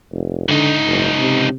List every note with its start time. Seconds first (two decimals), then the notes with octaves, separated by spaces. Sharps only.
0.13 F1
0.49 C#2 D3 D#4
0.87 F#1
1.19 C3